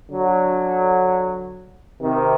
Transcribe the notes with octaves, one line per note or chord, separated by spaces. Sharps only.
D3 F#3
C3 D#3